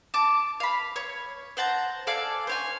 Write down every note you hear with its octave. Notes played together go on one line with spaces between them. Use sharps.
A5 D6
F5 B5
C#5
C5 F#5 A5 A#5
A4 D5 F5 G#5
C5 C#5 G#5